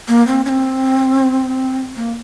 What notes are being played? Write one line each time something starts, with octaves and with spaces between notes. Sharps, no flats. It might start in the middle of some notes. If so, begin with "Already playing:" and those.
A#3
C4
C#4
C4
A#3